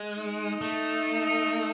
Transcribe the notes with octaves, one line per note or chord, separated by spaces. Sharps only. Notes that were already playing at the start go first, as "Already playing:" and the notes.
Already playing: G#3
D#4
A3